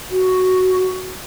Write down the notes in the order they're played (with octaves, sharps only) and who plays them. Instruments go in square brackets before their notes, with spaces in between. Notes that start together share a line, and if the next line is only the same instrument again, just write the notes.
[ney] F#4